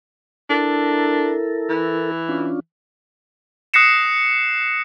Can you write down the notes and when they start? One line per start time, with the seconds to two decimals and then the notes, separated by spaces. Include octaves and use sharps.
0.50 D4 E4 A4 A#4
1.70 E3
2.29 C#4 D4 F4
3.74 D#6 F#6 A#6 C7 C#7 E7